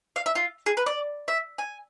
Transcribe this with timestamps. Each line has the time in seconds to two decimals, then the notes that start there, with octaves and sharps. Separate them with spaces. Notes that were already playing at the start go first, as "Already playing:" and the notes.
0.16 F5
0.26 E5
0.35 F4
0.66 G#4
0.77 B4
0.86 D5
1.28 E5
1.58 G#5